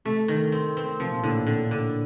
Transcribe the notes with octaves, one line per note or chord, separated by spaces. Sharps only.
C3 A3
D#3
C4
C4
C3 F3
A#2
A2 D3
A#2
D3
D3